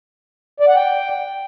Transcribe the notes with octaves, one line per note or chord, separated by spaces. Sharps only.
D5
F#5
G5